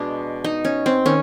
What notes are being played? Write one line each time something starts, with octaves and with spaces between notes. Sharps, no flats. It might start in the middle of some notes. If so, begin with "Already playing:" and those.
Already playing: B2 G#3 B3 D4
D#4
C#4
C4
D#3 C#4